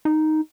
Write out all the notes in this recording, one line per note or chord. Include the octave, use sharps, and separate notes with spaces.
D#4